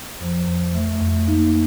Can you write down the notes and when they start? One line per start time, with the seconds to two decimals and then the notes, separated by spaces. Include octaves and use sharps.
0.21 F2 F3
0.47 F2
0.74 F2 A3
1.00 F2
1.28 A#3 D#4